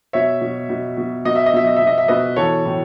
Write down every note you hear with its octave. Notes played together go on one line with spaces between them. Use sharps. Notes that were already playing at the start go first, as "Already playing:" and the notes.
B2 C#5 E5
B2
B2
B2
B2 D#5
E5
D#5
B2 E5
D#5
B2 E5
D#5
E5
B2 B4 D#5
E3 A4 C#5
A2